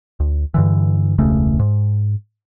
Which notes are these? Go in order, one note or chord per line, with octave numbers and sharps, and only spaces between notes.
D2
G2 D3 E3
E1 C#2 C#3 A3
G#2